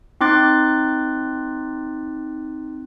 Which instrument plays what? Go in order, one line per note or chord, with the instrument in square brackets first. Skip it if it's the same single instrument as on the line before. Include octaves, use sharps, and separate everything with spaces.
[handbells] C4 D#4 C6 D6 F#6 A6